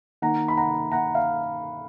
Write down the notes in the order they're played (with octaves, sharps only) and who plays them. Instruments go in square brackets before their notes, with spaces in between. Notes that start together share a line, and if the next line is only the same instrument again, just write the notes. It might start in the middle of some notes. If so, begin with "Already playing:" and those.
[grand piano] D#3 A#3 F#5 A#5
B5
F#5 A#5
F#5 A#5
F5